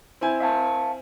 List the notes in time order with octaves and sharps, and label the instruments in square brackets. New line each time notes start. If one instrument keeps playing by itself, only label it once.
[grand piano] C4 E4 G#5
[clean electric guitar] E5 F5 A5